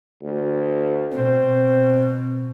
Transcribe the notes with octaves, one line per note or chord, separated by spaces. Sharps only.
D2
B2 C4